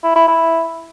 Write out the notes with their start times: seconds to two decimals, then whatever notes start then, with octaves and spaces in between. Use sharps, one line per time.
0.04 E4
0.15 E4
0.27 E4